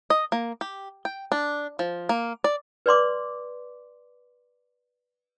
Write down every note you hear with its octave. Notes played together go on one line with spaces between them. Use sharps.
D#5
A#3
G4
G5
D4
F3
A#3
D5
B4 D5 C6 D6